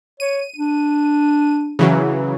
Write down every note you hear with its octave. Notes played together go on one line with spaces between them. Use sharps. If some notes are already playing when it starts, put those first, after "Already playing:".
C#5 D#7
D4
C#3 E3 F#3